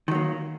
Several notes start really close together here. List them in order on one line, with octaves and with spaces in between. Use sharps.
D#3 F#3 A#3